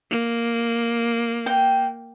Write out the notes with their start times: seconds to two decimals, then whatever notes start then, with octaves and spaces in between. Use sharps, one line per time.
0.11 A#3
1.46 G5